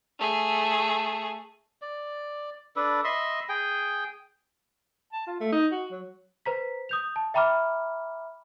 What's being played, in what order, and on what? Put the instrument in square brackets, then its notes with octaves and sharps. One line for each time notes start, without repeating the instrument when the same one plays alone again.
[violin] A3 G#4
[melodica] D5
D4 A4 B4
D#5 E5 B5 C6
G#4 G5
[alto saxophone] A5
F4
A3
D#4
F#4
F#3
[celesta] B4 C5 A#5 B6
D#6 G6 F7
A5
E5 G5 A#5 B5 D6 F6